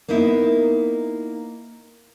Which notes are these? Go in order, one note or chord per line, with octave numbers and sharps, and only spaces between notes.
A#3 B3 D#4 E4